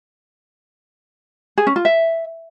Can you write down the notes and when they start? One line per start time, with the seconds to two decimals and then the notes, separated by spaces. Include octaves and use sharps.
1.58 G#4
1.67 C#4
1.76 F4
1.85 E5